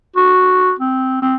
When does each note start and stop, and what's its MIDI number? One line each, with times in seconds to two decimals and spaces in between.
0.16 0.72 66
0.79 1.21 60
1.22 1.36 60